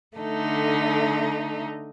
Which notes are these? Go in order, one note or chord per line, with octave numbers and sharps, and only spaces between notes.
D3 A3 D#4